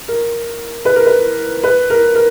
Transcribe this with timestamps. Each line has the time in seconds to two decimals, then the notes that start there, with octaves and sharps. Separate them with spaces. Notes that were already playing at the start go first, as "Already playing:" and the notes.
0.08 A#4
0.85 B4
0.96 A#4
1.06 B4
1.64 B4
1.90 A#4
2.15 A#4